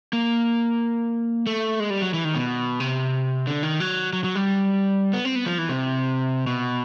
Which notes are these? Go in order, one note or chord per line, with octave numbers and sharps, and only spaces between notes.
A#3
A3
G#3
G3
F#3
E3
D#3
B2
C3
D3
D#3
F#3
F#3
F#3
G3
B3
C4
B3
F3
E3
C3
B2